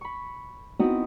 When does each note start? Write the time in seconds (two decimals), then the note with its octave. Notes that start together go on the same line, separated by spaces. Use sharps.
0.01 B5 C#6
0.79 B3 C4 D#4 E4 F#4 D#5